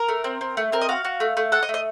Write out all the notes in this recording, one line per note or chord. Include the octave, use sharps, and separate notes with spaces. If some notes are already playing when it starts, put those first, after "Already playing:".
Already playing: A#4
A3
C4
C4
A3
C4 A#4
D#5
F#4 F5
F#4
A3
A3
A4 F#5
D#5
A3
D#5